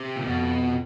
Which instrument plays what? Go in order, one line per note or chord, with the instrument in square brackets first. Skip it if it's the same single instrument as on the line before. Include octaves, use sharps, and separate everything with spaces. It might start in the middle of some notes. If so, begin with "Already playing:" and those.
Already playing: [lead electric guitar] C3
A#2
[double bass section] F2 [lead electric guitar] B2